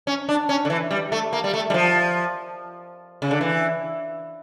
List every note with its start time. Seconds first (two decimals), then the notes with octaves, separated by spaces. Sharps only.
0.07 C#4
0.29 D4
0.49 C#4
0.65 D3
0.70 E3
0.91 G3
1.12 A3
1.33 A#3
1.44 G3
1.54 A3
1.70 G3
1.74 F3
3.22 C#3
3.31 D3
3.41 E3